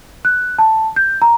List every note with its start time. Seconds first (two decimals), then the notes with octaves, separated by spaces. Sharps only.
0.25 F#6
0.58 A5
0.96 G6
1.22 A#5